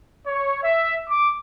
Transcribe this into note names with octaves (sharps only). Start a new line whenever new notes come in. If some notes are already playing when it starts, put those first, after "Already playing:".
C#5
E5
D6